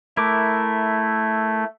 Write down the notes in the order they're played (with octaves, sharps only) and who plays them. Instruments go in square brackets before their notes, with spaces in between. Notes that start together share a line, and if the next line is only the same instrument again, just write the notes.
[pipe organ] A3 [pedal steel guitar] E4 A#4 D6